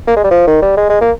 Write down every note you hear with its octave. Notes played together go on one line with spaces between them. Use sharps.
A#3
G#3
G3
F3
D#3
G3
G#3
G#3
A#3